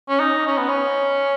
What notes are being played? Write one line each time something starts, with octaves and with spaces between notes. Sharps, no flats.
C#4
D#4
C#4
B3
C#4